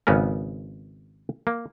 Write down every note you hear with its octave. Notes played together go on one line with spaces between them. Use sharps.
G#1 C#3 B3 C#4 A#4
A#3